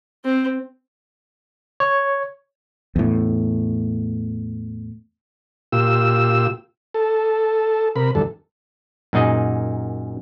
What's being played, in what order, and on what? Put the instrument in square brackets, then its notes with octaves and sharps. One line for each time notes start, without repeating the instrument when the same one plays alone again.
[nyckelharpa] C4
[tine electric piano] C#5
[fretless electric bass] E2 A2
[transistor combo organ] A#2 F4 G4 E6
A4
C3 A#4 B5
E2 G2 D3 A4
[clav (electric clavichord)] F#2 A#2 D#4 G#4 D#5